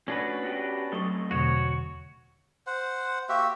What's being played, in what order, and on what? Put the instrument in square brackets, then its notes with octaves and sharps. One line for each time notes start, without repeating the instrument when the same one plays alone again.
[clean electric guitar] A2 F#4 [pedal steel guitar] C#4 D4 B4
[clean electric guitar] B3 F#4 G4
[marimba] F#3 C#6 [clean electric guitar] A3 C4 D#5
[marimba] E2 B2 D3 [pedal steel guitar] F#4 C#5
[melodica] C5 F#5
A#3 F#4 G4 E5